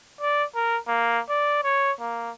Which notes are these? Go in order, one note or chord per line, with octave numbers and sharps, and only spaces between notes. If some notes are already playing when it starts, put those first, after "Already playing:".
D5
A#4
A#3
D5
C#5
A#3